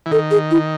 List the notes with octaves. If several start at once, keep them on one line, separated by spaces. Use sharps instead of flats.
E3
D#3 A4
G#4
E4